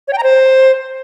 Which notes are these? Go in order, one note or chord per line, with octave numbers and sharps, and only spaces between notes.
C#5
G5
A#5
C5